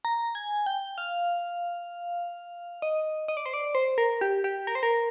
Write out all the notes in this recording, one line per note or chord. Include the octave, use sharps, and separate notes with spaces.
A#5
G#5
G5
F5
D#5
D#5
D5
C5
D5
C5
A#4
G4
G4
A#4
C5
A#4